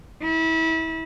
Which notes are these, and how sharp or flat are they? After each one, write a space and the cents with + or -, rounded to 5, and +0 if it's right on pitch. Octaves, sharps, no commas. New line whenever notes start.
E4 -30